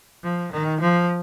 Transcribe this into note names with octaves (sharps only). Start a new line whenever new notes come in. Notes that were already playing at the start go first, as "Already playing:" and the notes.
F3
D#3
F3